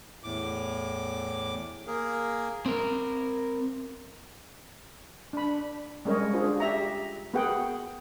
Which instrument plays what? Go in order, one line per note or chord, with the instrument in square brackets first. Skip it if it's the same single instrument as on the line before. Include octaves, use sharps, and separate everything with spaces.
[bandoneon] E2 A2 D6
A#3 G#4 A#4
[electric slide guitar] C4 A#4
[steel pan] D4 B5
G3 G#3 C#4 A#4 C#5 D#5
D4 F4 F#4 G#4 C5
G4 E5 A#5
B3 F#4 G#4 A#4 F#5 G5